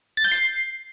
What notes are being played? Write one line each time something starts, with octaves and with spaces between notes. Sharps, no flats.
A6
G6
C7